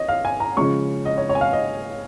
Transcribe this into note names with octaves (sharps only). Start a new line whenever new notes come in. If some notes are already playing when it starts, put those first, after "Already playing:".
Already playing: C#5 D#5
F5
G#5
A#5
C#3 F3 G#3 C#4 C#6
D#5
C#5
C#5
G#5
F5
D#5